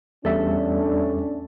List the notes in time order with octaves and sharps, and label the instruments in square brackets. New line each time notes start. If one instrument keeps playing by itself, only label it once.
[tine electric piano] E2 G3 E5 [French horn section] A2 C#4 D4 [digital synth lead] A4